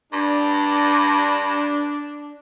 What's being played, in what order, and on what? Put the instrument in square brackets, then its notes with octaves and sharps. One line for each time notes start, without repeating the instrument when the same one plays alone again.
[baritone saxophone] G2 [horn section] D4